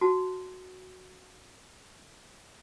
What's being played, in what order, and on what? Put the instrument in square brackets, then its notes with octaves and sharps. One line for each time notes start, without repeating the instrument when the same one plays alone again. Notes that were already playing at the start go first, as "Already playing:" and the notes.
[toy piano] F#4 A5